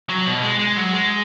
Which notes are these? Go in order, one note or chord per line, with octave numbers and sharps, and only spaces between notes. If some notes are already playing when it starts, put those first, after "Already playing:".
F#3
B2
G#3
G#3
F#3
G#3